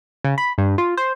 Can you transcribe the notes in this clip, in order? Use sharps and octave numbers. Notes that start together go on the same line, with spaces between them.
C#3
B5
G2
F4
C5